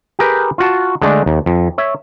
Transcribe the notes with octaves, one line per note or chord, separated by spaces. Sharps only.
G4 G#4 A#4 B4 G5
F4 F#4 A5
D3 G#3 A3 D4
D#2
F2
C#5 E5